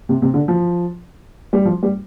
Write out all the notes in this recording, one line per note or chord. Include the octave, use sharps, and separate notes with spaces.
C3
C3
D3
F3
G3
F3
G3